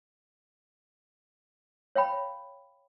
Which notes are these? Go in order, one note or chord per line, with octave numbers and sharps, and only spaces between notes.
C#5 F5 G5 B5